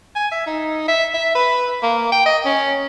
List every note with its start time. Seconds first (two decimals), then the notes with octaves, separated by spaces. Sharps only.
0.16 G#5
0.32 E5
0.46 D#4
0.88 E5
1.14 E5
1.35 B4
1.83 A#3
2.12 G5
2.26 D#5
2.45 C#4